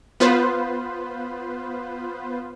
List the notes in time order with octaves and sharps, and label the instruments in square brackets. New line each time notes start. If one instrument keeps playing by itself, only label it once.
[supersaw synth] B3 F4 B4 C5